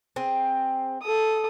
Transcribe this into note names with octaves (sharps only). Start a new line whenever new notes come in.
C4 G#4
A4 D#6